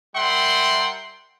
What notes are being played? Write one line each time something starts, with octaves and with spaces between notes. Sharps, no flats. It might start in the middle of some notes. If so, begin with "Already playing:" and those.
G3 A#4 E5 F#5 G5 C6